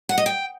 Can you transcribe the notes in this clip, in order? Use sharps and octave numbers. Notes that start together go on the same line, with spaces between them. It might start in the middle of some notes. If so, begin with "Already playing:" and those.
F#5
D#5
G5